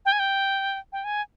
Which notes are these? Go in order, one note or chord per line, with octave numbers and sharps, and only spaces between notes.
G5
G#5
G5
G5
G#5